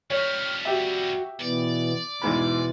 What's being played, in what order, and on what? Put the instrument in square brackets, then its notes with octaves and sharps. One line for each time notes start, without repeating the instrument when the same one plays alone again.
[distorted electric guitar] F2 G3 [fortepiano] C#5 [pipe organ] F6
[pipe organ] F#4 [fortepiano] G4 E5
[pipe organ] B2 E3 B3 [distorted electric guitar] D5
[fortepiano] E2 G#2 B5 [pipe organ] B2 E3